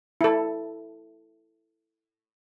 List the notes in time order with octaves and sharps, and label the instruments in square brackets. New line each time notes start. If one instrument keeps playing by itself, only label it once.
[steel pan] E4 A4